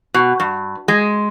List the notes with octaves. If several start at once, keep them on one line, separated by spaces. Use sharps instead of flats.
B2
G2
G#3